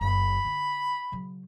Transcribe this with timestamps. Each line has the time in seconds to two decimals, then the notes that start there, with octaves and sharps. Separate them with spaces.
0.01 F#1 B5
0.45 D3 C#4
1.12 C#3 F#3